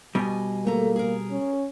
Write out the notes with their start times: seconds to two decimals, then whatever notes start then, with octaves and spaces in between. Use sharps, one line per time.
0.15 B2 G3 D#5 G#5
0.65 D2 A3 A#3 A#5
0.96 G#4 A#4
1.31 C#4